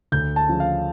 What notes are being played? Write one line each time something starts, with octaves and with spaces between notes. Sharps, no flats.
D2 G6
A5
C#3 F3 C#4
F5